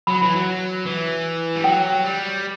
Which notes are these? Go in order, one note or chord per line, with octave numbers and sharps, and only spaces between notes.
F#3 B5
E3
F#3
E3
G3
F#3 G5
G3